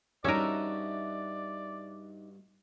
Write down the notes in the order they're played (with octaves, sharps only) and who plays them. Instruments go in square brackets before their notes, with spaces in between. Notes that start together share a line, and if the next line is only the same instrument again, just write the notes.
[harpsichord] G2 F#4 [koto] C#4 A#4 [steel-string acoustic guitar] D#4 E5 [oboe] D5